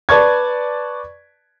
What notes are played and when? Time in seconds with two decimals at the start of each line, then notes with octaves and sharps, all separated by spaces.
0.09 B4 D5 A5 C#6 G#6